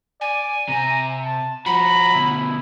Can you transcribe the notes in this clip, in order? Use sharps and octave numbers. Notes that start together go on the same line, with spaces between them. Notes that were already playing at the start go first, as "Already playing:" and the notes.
D5 G#5
C3 A#5
A5
F3 F#4 A#5 B5
D2 B2 E4